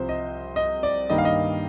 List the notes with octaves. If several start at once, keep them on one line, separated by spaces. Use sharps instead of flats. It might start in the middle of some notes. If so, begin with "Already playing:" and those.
Already playing: C2 C3 F3 C5
D#5
D#5
D5
G2 D#3 A#3 D#5
F5
D#5